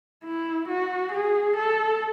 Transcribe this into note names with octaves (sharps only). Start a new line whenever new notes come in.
E4
F#4
G#4
A4